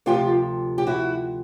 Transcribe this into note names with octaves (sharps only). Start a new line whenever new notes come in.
D2 C3 F3 F4 G4
G4
E4 F#4